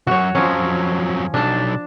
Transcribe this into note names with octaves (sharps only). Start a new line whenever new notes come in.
C2 F#2 F#4 C#5
F2 F3 F#3 C#4
B1 D4 A5